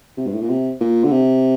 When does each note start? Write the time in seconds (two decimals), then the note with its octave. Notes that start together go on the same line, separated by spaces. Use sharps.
0.18 C3
0.27 G2
0.34 A2
0.42 A#2
0.49 C3
0.81 A#2
1.04 D3
1.12 C3